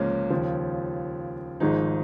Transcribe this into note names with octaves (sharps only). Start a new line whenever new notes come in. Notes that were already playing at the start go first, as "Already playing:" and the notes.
Already playing: C#2 C#3 F3 G#3 A#3 C#4
D#2 C#3 F3
G#1 G#2 F3 D#4 G#4